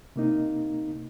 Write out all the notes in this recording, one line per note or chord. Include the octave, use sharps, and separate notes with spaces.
C3 A#3 D#4